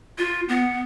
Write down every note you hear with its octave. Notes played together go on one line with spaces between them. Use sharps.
F4
B3